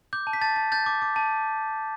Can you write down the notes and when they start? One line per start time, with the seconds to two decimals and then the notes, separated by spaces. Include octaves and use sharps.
0.13 D6 G6
0.27 A5
0.33 B6
0.41 A5 A6
0.56 A5
0.72 G6 A6
0.86 D6
1.02 D6
1.16 A5